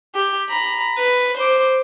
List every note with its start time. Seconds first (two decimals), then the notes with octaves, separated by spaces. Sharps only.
0.15 G4
0.49 A#5 B5
0.98 B4
1.37 C5 D6